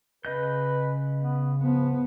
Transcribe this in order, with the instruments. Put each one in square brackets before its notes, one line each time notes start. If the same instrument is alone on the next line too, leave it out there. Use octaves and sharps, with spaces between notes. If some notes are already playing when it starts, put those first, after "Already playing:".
[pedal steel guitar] C#3 D#5 G6 [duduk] B4
[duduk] B3
[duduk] F3 [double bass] B3